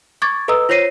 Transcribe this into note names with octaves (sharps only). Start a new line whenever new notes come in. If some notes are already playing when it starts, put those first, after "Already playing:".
C#6 D6 G#6 A6
A4 B4 D#5 A#5 D#6 E6
F4 C5 C#5 A#6 C7 D#7